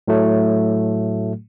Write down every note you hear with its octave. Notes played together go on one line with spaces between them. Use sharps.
A2 F#3 A3